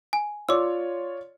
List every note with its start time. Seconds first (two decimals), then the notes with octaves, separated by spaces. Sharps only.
0.13 G#5
0.49 F4 C#5 D5 D6 E6